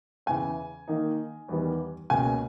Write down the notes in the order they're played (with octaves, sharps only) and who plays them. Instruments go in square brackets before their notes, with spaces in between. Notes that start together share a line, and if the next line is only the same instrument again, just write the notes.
[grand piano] E2 C#3 E3 [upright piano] G#5
[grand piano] D#3 A#3 D#4
E2 D#3 G3 B3
[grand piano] C#2 B2 A#3 C#4 [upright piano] G#5